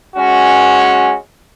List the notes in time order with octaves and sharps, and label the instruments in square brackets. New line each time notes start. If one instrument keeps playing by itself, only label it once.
[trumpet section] G#3 C#4 F#4